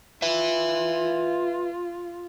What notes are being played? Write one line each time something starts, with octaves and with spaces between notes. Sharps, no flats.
F4 B4 E5